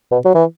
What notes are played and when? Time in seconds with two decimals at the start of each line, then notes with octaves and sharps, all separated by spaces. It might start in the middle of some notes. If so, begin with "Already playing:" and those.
0.11 B2
0.25 F#3
0.35 E3